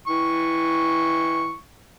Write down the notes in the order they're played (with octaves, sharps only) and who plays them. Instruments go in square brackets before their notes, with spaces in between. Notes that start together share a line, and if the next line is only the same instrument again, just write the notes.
[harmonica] E3 C#6